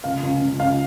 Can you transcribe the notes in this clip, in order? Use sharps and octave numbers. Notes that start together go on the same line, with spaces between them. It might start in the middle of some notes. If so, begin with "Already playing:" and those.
C#2 F5
C#2
C#2
C#2 F5